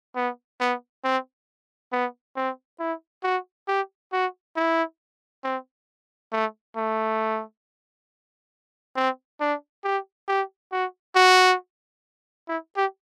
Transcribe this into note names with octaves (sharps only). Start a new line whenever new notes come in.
B3
B3
C4
B3
C4
E4
F#4
G4
F#4
E4
C4
A3
A3
C4
D4
G4
G4
F#4
F#4
E4
G4